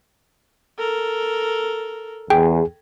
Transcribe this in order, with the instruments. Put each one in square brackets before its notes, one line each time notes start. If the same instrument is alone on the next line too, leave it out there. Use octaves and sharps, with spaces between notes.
[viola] A4 A#4
[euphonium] E2 [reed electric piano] G#4 [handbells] G5